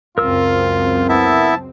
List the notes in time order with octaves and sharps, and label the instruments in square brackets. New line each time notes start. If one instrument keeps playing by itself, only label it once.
[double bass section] C#2 F#2 C4 [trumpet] F4 [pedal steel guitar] A#4 E6
[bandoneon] B3 E4 E5 [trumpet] A5